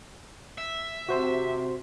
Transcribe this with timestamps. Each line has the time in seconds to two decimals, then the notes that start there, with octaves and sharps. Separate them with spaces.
0.58 E5
1.09 C3 F#4 C5 C6